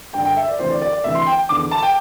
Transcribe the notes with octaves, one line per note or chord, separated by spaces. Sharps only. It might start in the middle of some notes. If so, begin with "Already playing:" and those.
G2 D3 G5
G5
E5
D5
D2 C3 E3 C5
D5
D5
D5
D2 C3 E3 E5
C6
G5
E2 D3 D6
A5
G5